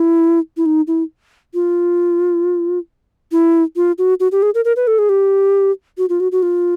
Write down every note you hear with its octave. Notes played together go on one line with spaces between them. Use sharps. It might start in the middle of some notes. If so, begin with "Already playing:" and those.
Already playing: E4
E4
D#4
E4
F4
E4
F4
F#4
F#4
G4
G#4
A#4
A#4
B4
A4
G#4
G4
F#4
F4
F#4
F#4
F4